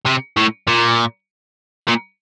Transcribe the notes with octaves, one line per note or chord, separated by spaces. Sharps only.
C3
A2
A#2
A#2